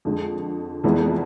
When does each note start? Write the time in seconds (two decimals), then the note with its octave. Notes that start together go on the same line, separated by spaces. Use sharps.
0.05 F2 D3 G#3
0.84 F1 F2 E3 G#3 B3